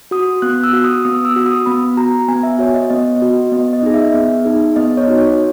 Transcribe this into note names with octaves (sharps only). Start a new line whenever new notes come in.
F#4 D#6
B3 F#6
E6
F#4
D#6
B3 D#6
E6
F#4
D#6
B3 B5
F#4 A#5
B3 G#5
E5
F#4 C#5
D#5
B3 D#5
F#4
B3 D#5
D#5
D#4 G#4
E5
B3
D#4 G#4
B3 D#5
C#5
D#4 F#4
C#5